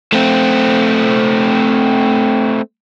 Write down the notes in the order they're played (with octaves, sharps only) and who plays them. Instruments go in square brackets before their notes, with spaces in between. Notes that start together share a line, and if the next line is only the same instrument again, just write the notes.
[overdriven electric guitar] A3 C4